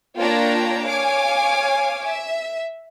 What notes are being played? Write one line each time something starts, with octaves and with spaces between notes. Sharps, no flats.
A#3 D4 F4 C#5 G5 A#5
C#5 F5 G#5 D6
E5